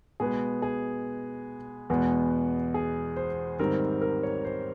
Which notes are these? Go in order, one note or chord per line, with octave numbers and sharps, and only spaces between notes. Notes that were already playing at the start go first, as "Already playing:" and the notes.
B2 G#3 B3 G#4
G#4
E2 B2 G#3 B3
G#4
C5
G#2 D#3 G3 C4 A#4
A#4
C#5
C5